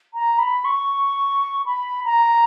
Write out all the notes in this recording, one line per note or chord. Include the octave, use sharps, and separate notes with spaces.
A#5
B5
C#6
B5
A#5